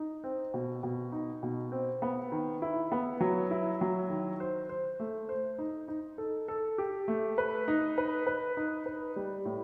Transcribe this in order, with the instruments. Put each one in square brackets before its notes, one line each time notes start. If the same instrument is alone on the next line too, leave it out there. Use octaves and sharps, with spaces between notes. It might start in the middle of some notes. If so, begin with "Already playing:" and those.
Already playing: [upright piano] D#4
C4
B2
B2
D#4
B2
C4
B3
D#3
E4
B3
F#3
E4
F#3
D#3
C5
C5
A3
C5
D#4
D#4
A4
A4
G4
A3
B4
D#4
B4
B4
D#4
B4
G3
A2